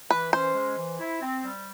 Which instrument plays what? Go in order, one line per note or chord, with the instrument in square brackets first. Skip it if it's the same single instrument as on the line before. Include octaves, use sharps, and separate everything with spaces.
[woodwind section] E3 [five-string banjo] B4
[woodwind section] C#4 [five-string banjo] C5
[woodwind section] G#3
E3
E4
C4
G3